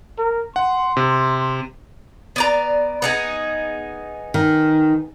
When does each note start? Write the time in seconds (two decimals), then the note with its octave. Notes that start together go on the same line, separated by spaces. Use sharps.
0.18 A#4
0.56 F#5 C6
0.97 C3
2.36 B3 D5 A#5
3.02 B3 D#4 G#4
4.34 D#3